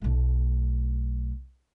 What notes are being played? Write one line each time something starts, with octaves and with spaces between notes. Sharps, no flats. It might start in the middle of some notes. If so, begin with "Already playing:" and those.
B1 A3